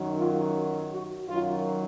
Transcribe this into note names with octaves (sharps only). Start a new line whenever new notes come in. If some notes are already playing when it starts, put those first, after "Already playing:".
Already playing: F#2 D#3 F#3
F4
F#4
F#2 D#3 F#3 F4